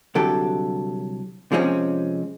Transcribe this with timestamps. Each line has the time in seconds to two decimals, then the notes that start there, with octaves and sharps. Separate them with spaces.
0.15 C2 D3 F#3 G4 A4
1.52 C3 F3 G#3 C4 C#4